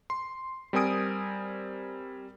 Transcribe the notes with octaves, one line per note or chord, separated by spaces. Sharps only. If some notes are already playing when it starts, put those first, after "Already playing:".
C6
G3 C4 A#4 G#5 D#6 D7